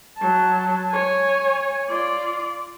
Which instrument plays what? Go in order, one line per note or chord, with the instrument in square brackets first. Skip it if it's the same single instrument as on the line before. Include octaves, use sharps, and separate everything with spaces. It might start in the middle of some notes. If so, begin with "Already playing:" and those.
[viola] F#3 A5
C#5 G#5
F4 D5